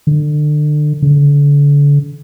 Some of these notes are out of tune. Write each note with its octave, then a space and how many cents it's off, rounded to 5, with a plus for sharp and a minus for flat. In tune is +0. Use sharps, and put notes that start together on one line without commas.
D3 +30
D3 -35